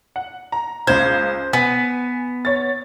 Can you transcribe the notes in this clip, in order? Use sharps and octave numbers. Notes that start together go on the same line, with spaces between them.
F#5
A#5
C#2 C5 G#6
B3 G#5
C#5 A6